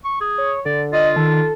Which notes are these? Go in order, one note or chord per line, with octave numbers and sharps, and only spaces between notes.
C#6
G#4
C#5
D3 D5
F4 D#5
D#3 A4